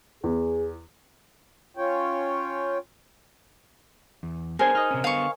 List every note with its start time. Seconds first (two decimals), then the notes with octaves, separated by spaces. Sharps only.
0.24 E2 G#4
1.77 C#4 F4 C#5 G5
4.23 E2
4.59 B3 C4 D4 G#4 A#4 C5 G#5
4.75 D#4 D#5 F6
4.91 C3 C#4
5.04 D3 B3 F5 C#6